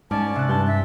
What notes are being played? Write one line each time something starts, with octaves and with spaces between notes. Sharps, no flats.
G#2 C#4 D5 G#5 A5
C3 F#6
G2 A5 G6
E5